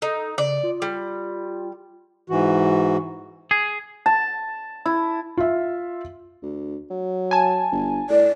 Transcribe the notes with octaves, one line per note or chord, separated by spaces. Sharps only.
D#4 A4
C#3 D5
F4
G3
G#2 E3 F#4
G#4
A5
E4
F4 E5
D2
F#3
G#5 A5
G1
A2 D5